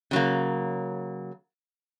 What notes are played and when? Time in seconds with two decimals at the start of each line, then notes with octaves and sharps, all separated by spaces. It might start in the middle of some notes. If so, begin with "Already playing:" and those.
0.11 C#3 F#3 A#3